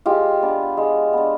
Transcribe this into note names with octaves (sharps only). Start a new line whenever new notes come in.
G#3 F4 G4
B3 D4
G#3
B3 D4